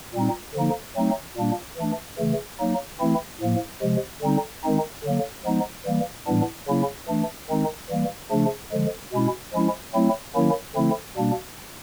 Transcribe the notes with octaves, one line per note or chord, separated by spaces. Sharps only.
A#2 G3 C4 D#4
D3 F3 A#3 D#4
F#3 A3 C4 D#4
A#2 G3 A#3 D4
E3 A3 D4
C#3 E3 A3
F#3 A#3 D#4
E3 A3 C4 E4
A2 F3 A#3
C3 F3 G#3
D3 G3 C4 D#4
D#3 G#3 C4 D#4
D3 F#3 A#3
F3 G#3 B3 D#4
E3 G3 A#3
A2 E3 G3 B3 D4
C#3 F#3 A#3 C#4 E4
E3 A3 D4
D#3 G#3 C4 D#4
E3 G3 A#3
C#3 F3 A3 D4
D3 F3 G#3
B2 G#3 C#4 E4
F3 G#3 C#4 E4
F#3 A3 C4 E4
D#3 F#3 A#3 C#4 E4
D3 F3 A3 C4 E4
B2 G3 A#3 D4